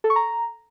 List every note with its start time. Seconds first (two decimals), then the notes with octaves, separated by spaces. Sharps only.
0.04 A4
0.10 C#6
0.16 A#5